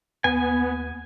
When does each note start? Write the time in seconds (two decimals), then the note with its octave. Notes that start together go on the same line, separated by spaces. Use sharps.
0.24 D#2 B3 G#5